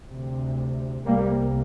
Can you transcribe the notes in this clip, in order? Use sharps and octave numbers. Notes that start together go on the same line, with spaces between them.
D2 C3
C2 C3 G3 A#3